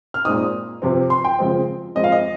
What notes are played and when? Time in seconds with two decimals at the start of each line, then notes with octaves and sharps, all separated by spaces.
0.14 F6
0.25 A#2 G#3 C4 D#4 D#6
0.82 C3 F3 C4
1.10 C6
1.24 G5
1.39 C#3 F3 G#3 C4
1.95 F3 G#3 C4 D#5
2.04 F5
2.12 D#5